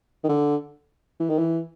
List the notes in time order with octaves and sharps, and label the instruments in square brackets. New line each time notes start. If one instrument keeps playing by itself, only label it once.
[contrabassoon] D#3
D3
E3
D#3
E3